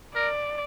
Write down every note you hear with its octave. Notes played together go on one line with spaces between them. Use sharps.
A#4 D5